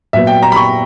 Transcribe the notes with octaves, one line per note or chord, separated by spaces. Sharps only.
A#2 F#3 B3 E5
G5
A#5
B5
C#6